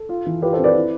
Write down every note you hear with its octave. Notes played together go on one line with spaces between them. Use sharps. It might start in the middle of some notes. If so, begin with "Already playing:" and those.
Already playing: A4
F4
E3
F4 G4 B4
A4 C5
C4
B4 D5
E4